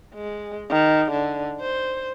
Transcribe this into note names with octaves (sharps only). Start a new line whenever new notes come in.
G#3
D#3
D3
C5